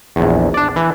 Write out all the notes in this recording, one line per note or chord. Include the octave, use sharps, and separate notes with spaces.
A#1 E2
D4 D5
E3